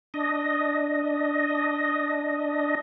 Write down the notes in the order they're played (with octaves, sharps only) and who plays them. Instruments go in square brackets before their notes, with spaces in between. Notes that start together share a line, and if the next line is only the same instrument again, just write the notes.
[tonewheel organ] D4 D#5